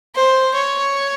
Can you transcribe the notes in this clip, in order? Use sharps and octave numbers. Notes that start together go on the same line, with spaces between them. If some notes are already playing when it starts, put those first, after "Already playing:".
C5
C#5